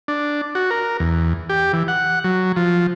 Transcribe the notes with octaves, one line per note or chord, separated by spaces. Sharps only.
D4
F#4
A#4
E2
G4
E3
F#5
F#3
F3